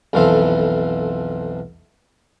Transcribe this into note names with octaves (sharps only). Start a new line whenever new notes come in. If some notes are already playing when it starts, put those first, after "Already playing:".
B1 F2 E3 F3 F4 A4